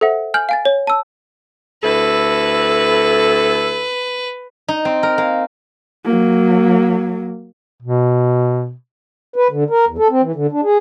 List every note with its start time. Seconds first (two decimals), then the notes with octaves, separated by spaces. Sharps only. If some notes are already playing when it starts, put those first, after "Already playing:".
0.01 A4 C5 E5 F#5
0.34 G#5 F6 G6 F#7
0.49 F5 G#5 A6
0.65 C#5
0.87 A5 E6
1.83 D2 E4 A4 B4
4.68 D#4
4.85 C4
5.03 A#4
5.18 A#3
6.06 F#3 A#3
7.82 B2
9.36 B4
9.51 D3
9.70 A#4
9.87 E2
9.98 A4
10.10 C4
10.22 E3
10.35 D3
10.52 D4
10.64 G#4